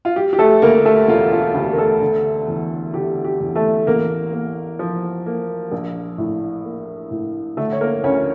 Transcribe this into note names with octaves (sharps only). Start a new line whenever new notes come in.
F4
G3 G4
G4
A3 A4
D2 A#3 A#4
A3 A4
E1 F4
F4
D2 G4
A#4
A3 A4
D3
E2
D3 G4
G4
E2
A3 A4
A1 A#3 A#4
A#3
F3
A#3
A#1
A2
A#3
A2
D3 A3 A4
C#5
A#3 A#4
D2 C#4 C#5